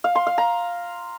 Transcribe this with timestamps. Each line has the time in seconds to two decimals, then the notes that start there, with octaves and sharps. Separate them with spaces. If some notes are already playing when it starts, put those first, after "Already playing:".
0.04 F5
0.15 C6
0.27 F5
0.38 A#5